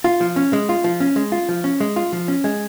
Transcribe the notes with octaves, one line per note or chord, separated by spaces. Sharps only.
F4
F3
C#4
G#3
F4
F3
C#4
G#3
F4
F3
C#4
G#3
F4
F3
C#4
G#3